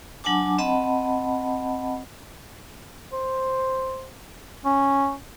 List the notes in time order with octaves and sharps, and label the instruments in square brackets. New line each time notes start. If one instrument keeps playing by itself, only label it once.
[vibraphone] F#3 D4 F#5 G#5 A5 D6
C4 D#5 F#5 A5 B5
[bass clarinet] C5
C#4